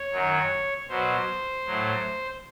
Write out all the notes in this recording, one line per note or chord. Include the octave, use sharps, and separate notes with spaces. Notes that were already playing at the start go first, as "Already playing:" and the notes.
Already playing: C#5
F#2 D#3 F#3
B2 F#3 C5
A2 F#3